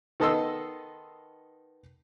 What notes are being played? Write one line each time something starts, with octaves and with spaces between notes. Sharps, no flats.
D#3 B3 A4 D#5 C6 E6